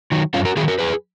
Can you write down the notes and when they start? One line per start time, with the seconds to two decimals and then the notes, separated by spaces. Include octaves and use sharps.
0.12 D#3 F#3
0.34 F#2 C#4 F4
0.45 F#4 A#4
0.56 D#3 F4 G#4
0.60 F#3
0.68 F#4 A#4
0.79 F2 G#4 B4